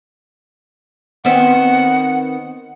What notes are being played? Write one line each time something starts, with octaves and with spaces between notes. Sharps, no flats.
D#3 B3 C4 F#5